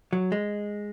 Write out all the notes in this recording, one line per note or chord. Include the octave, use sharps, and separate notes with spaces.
F#3
G#3